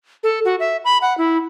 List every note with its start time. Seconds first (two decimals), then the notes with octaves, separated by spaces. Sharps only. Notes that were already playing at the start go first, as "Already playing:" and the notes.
0.23 A4
0.45 F#4
0.60 E5
0.85 B5
1.02 F#5
1.18 E4